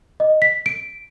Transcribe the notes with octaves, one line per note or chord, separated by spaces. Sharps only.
D#5
B6
D7